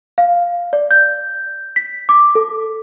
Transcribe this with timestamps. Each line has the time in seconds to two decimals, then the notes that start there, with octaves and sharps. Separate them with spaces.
0.18 F5
0.73 D5
0.91 G6
1.76 B6
2.09 D6
2.35 A4